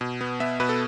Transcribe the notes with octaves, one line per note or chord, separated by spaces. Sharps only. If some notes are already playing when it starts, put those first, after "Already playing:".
B2
B3
B3 E5
B2 B4
A4